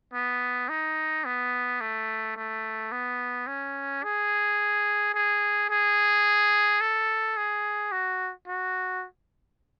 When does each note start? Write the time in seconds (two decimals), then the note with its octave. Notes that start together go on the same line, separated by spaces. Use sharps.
0.14 B3
0.69 D#4
1.25 B3
1.81 A3
2.36 A3
2.92 B3
3.47 C#4
4.04 G#4
5.14 G#4
5.70 G#4
6.81 A4
7.37 G#4
7.92 F#4
8.48 F#4